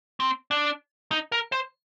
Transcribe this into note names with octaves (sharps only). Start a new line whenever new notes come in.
C4
D4
D#4
A#4
C5